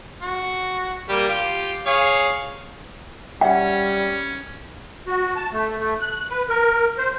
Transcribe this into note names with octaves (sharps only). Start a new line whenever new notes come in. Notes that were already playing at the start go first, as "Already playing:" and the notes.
F#4
G3 A#3 G4
F4 G4
G#4 C#5 F5
G3 C#4 E5 F#5 G5
F#4
A5
A3
A3
F#6
B4
A#4
C5